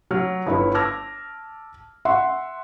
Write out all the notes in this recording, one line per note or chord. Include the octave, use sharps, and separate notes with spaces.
F#3 F6
G1 E4 B4 C#5
A5 D6 E6 F6 G#6 A#6
E5 F#5 C6 C#6